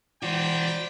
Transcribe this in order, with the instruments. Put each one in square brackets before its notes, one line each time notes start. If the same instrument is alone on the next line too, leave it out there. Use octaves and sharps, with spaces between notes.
[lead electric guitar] E3 F#4 [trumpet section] C5 D5 G5